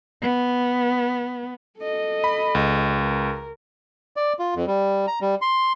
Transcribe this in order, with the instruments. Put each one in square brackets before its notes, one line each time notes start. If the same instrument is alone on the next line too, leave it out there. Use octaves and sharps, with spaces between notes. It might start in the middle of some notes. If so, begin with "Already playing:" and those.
[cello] B3
[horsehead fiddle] A4 D#5
[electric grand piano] B5
C#2
[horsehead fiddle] A#4
[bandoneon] D5
F4
F2
G3
A#5
G3
C6